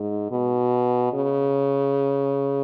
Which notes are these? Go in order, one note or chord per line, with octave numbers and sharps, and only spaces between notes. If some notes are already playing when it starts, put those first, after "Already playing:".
Already playing: G#2
B2
C#3